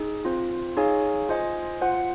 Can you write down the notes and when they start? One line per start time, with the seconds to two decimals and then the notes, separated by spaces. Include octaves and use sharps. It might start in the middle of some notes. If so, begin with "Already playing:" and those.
Already playing: D#4 G#4
0.25 C4 F4 C5
0.77 D#4 G#4 C#5 F5 G#5
1.29 F4 C5 D#5 G#5
1.81 F4 C5 F#5